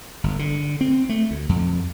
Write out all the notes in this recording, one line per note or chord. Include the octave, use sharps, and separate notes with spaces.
G1
D3
C4
A3
D2
F2